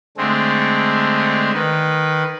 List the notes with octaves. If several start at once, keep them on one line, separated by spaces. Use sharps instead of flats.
D3 G#3 A3 C4
D#3 B4